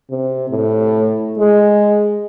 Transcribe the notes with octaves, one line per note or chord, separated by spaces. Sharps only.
C3
A2
G#3